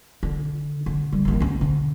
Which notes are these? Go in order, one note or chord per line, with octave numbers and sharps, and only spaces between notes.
D3
D3
G3
A1 D#2
D2 C#4
D3